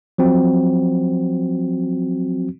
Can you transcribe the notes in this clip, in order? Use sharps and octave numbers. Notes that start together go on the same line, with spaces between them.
F3 F#3 C4 F#4